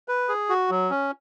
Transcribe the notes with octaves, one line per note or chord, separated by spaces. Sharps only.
B4
G#4
F#4
F#3
C#4